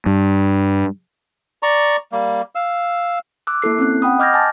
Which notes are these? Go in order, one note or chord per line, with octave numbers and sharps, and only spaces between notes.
G2
D5 A#5 C#6
G3 A#3
F5 E6
D6 E6 F#6
A#3 E4 A4 C7
C4 C#4 F#6
F#5 G5 B5 D#6
D#5 D6 F6 G6 G#6 A#6
G#5 A5 D6 A6